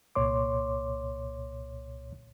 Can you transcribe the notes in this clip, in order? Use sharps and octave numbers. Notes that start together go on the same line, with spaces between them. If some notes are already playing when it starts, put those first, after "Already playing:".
C2 A#2 C#5 C6 D6